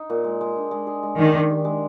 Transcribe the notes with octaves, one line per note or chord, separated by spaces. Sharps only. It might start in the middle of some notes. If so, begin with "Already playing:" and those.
Already playing: D#4
A#2
G#3
G#3
D4
G#3
G#4
G#3
D#3 D4
D4
G4
G#3